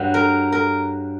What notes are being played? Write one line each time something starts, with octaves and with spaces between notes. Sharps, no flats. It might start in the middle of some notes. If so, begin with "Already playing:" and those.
Already playing: G2 F#3
A#4
A#4